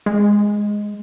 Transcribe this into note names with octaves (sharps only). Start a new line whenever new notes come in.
G#3